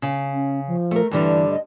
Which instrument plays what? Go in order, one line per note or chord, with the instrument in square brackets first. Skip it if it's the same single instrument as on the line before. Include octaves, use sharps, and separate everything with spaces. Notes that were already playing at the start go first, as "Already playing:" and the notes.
[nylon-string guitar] C#3
[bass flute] C#4
F3
[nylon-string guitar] A3 A#4
[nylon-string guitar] G2 D3 G3 [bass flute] E3
[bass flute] D#5